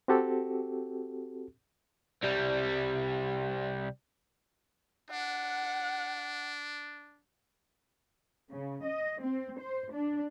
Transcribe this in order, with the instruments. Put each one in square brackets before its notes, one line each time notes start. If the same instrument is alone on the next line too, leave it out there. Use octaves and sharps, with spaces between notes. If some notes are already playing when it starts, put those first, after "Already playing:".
[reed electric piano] C4 F#4 G4 A4
[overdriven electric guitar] C2 G3
[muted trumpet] D4 [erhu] F#5
[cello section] C#3
D#5
C4
C5
D4